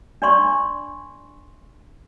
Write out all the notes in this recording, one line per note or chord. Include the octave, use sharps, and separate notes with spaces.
D4 D5 C6 C#6